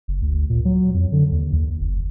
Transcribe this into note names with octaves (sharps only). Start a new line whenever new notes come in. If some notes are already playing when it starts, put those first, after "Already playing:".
F#1
D2
A#2
F#3
F2
D3
D#2
D#2
F#1